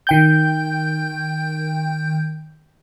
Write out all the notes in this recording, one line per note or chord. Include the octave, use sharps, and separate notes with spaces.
D#3 G5 G6